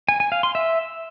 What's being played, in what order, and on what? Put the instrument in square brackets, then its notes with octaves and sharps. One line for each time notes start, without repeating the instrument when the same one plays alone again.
[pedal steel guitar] G#5
G#5
F5
C6
E5